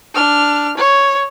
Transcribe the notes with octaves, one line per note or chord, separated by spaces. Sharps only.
D4 F6
C#5